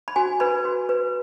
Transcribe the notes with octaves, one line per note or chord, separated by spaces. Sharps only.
B5
F#4 G#5
B4 B5
F#4
B4